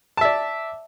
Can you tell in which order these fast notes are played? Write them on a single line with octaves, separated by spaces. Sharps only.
A5 E5 D5